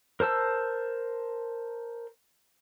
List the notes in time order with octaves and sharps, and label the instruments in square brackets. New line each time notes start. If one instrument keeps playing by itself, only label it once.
[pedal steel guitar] A#4 C5 A5 E6